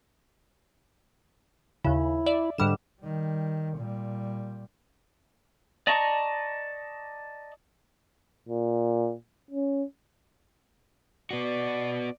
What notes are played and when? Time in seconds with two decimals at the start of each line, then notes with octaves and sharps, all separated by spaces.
1.85 D#2 C#3 E4
2.26 D5 E5
2.58 G#2 D3 G3 E7
3.02 D#3 G3
3.78 A#2 G3
5.87 D5 D#5 A5 A#5 C#6
8.49 A#2
9.51 C#4
11.31 B3 F#4 D5